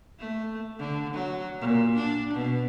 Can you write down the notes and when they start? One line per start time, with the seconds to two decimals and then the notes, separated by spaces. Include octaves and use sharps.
0.19 A3
0.78 D3
1.14 F#3
1.60 A#2
1.96 D4
2.33 B2